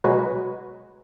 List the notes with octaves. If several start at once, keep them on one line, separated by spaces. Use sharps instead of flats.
B2 F#3 G#3 F#4 B4